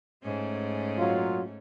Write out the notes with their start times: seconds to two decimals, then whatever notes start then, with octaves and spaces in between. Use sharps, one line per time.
0.23 G#2 A3 C#4
0.98 A#2 F#3 F4